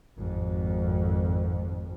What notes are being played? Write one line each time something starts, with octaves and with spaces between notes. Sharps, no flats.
G#1 F2